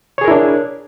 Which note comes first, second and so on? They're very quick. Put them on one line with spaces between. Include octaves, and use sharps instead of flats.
C#5 G#4 A#4 E4 D4